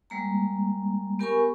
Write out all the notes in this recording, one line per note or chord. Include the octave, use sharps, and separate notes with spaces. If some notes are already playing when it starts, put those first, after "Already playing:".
G3 G#3 A#3 A#5
B3 G4 A#4 G#5 B5 C#6